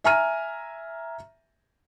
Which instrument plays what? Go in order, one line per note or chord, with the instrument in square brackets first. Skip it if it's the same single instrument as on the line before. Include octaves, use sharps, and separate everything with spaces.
[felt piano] E5 G#5 A#5 F6 D#7